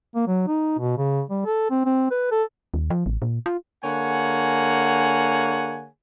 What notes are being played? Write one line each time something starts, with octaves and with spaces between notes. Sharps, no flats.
A#3
F#3
D#4
B2
C#3
G3
A4
C4
C4
B4
A4
D#2
F3
A1
A#2
F4
D3 A#3 G#4 C#5 F#5 G#5